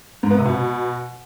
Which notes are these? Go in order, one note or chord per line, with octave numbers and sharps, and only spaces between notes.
G#2
B3
C3
B2